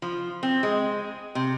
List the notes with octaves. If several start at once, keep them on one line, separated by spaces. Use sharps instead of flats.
F3
C4
G#3
C3